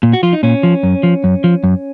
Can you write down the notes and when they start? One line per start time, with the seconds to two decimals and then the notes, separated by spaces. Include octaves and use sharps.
0.03 A#2
0.13 F#4
0.23 F3 F4
0.33 D#4
0.43 A#2 C#4
0.63 F3
0.83 F#2
1.03 F3
1.24 F#2
1.44 F3
1.64 F#2